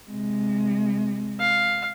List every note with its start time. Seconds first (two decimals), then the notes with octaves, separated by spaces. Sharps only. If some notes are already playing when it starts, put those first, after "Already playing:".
0.10 C3 G#3
1.40 F5